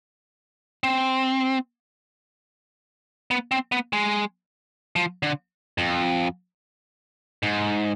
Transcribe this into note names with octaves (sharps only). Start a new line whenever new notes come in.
C4
B3
C4
B3
G#3
F3
D3
F2
G#2